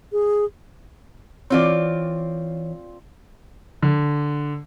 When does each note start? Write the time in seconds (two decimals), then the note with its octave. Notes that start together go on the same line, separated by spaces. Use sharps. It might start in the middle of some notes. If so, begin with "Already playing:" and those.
0.12 G#4
1.50 E3 C4 F4 C#5 D5
3.83 D3